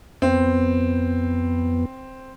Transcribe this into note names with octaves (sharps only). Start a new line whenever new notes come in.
F2 B3 C4